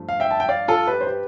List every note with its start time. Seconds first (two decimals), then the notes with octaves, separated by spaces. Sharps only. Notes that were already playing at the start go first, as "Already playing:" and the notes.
Already playing: G2 F3 A3
0.09 F5
0.20 E5 G5
0.31 A5
0.40 G5
0.49 D5 F5
0.68 F4 A4
0.87 G4 B4
1.01 C5
1.07 G4 B4